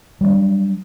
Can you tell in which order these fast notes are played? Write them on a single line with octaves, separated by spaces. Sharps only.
G3 A3 D4 F#3